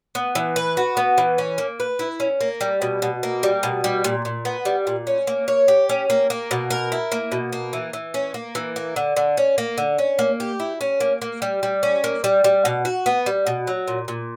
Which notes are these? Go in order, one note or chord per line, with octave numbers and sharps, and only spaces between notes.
B3
E3
B4
F#4
B3
E3
C#4
A#3
B4
E4
C#4
A#3
G3
B2
B2
A#3
G3
B2
G3
A#2
A#2
B3
G3
A#2
C#4
A#3
C#5
G4
C#4
A#3
A#3
B2
A#4
E4
A#3
B2
A#3
E3
E3
C#4
A#3
E3
A#3
D3
D3
C#4
A#3
D3
C#4
A#3
G4
E4
C#4
A#3
A#3
G3
G3
C#4
A#3
G3
G3
B2
F#4
B3
G3
B2
F#3
A#2
A#2